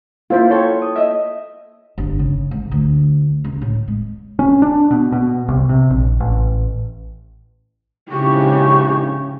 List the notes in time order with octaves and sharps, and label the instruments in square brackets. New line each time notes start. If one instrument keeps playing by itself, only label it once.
[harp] A#3 E4 [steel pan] F4 C5
[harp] A4 G5 [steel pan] C#5
[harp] D#6
D#5 E5
[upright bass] G1
C#3
G#2
D2
C#2
A2
G#3
[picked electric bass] C#4
D4
B2
B2
C2
C3
A#1
A1
[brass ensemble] A#1 G#2 E4 [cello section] C#3 [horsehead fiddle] G4 [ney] C#6